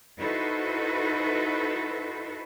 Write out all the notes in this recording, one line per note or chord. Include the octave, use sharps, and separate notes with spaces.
D#4 E4 F#4 A4 B4 C5